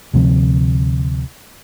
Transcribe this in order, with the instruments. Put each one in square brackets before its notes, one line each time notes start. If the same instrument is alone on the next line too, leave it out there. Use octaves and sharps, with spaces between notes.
[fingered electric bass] D2 C3 F3 C4